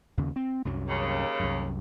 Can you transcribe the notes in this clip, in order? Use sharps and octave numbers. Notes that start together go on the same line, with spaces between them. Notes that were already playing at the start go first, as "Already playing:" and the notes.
D#2 C#3
C4
C2 F#2 F#3
D#2 C#3
C2 F#2